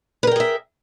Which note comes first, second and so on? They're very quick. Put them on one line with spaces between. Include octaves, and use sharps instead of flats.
B4 A#4 G5 G#4 E5